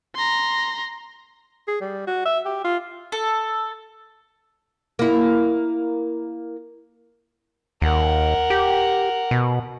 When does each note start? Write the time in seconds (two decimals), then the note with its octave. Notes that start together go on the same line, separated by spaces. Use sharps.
0.15 A#5 C6
1.68 G#4
1.81 G3
2.07 F#4
2.25 E5
2.45 G4
2.64 F4
3.12 A4
4.99 A#3 E4
7.82 D#2 A#4 F#5
8.50 G4
9.31 B2